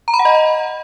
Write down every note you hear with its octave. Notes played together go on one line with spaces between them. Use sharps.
A#5
B5
F#5
D#5